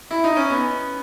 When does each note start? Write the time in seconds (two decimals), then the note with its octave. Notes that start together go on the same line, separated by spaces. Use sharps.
0.11 E4
0.24 D#4
0.37 C#4
0.50 B3